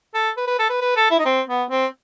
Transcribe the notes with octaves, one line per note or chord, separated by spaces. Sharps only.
A4
B4
B4
A4
B4
B4
A4
E4
D#4
C4
B3
C4